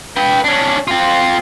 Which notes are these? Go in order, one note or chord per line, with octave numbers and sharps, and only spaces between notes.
B4 G5
C#4 D4
C4 F4